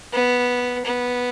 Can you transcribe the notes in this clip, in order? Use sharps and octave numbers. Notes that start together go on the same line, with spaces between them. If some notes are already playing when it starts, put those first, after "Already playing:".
B3
B3